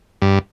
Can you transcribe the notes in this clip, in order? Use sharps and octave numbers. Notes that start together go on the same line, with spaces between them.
G2